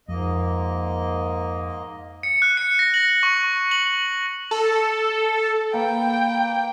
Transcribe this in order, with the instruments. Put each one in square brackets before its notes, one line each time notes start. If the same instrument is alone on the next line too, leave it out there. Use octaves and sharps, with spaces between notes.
[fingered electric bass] F2 [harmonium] G#2 A#3 D#5
[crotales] C#7
F#6
C#7
A#6
F#7
C#6
F#7
[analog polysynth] A4
[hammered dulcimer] A#3 B4 [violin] G5